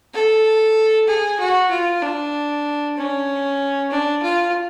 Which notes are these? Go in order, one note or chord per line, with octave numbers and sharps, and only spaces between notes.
A4
G#4
F#4
F4
D4
C#4
D4
F4